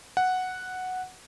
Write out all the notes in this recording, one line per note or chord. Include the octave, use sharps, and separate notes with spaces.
F#5